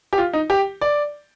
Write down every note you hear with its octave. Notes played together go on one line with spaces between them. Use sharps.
G4
F4
D#4
G4
D5